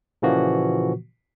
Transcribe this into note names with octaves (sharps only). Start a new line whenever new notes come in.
A#2 C#3 E3 F3 A#3 F#4